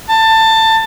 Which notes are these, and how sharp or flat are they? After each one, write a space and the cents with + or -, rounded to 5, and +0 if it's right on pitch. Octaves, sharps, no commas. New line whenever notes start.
A5 +20